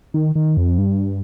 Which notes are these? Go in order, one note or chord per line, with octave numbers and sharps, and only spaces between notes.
D#3
D#3
F2
G2